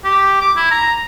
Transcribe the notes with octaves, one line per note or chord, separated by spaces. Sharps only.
G4
D6
E4
A#5